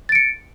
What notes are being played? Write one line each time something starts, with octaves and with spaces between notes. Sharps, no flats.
A6 C#7 D7